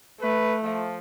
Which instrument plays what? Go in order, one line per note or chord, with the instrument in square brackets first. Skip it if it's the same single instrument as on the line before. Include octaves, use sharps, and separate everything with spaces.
[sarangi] A3 [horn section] B4
[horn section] F3